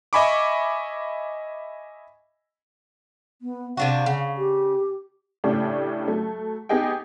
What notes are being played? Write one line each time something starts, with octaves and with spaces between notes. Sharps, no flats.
D#5 E5 G#5 B5 C#6 D6
B3
C3 D4 F#4 F5
C#3
G4
A2 C#3 A3 C#4 D4 G4
F#3 A3
B3 D#4 G4 G#4 D#5 G5